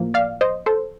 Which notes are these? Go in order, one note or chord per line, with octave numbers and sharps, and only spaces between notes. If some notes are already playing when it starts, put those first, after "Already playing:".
Already playing: A2 F3 A#3
D5 F5
C5 D#5
A4 C5